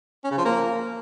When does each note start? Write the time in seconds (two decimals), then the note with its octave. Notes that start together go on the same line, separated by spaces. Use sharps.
0.24 C#4
0.31 C#3
0.38 F3
0.45 A#3